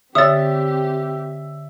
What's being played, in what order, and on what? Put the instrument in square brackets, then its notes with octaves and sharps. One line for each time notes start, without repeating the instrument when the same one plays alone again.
[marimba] D3 C#5 [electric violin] C4 G4 [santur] E5 [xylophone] D#6 A6